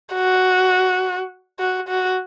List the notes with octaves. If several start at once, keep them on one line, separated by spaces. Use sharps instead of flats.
F#4
F#4
F#4